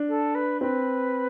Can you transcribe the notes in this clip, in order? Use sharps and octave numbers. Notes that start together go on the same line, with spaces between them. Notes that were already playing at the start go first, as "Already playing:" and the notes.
Already playing: D4
A4
B4
C4 B4